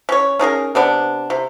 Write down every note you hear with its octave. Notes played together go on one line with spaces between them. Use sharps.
C#4 C#5
C#4 D#4 G#4 A#4
C3 B3 D4
C3